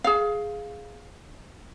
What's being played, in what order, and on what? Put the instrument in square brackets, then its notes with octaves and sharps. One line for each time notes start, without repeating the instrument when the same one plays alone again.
[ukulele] G#4 F5